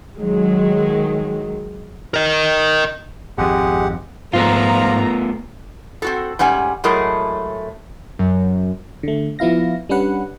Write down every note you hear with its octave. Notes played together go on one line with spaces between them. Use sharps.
D#3 F#3 G#3
A#4 D#5
G#1 F2 G#3 G4 F#5
G#2 F3 A3 B3 F4 A#5
C4 F#4 A4
G#2 G3 C#4 F#5 G#5
A2 F#3 G#3 A3 G#4 A#4
F#2
D3 A3
F3 B3 E4 F5 A#6
G3 C#4 D4 B4 F#5